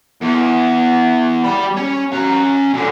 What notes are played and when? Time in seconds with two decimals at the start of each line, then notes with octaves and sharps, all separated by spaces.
0.21 E2
1.44 G3 B5
1.77 C#4 C#5
2.13 C#4 A#5
2.74 F#2 D3